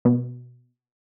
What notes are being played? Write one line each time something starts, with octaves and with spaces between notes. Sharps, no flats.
B2